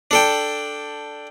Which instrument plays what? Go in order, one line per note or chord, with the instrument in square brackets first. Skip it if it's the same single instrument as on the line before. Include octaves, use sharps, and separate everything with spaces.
[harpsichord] D4 A4 G5